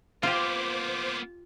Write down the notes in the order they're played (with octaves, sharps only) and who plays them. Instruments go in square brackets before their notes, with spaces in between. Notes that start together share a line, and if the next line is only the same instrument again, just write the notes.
[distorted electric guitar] A#3 B3 [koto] F4 G4 [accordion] C5 D6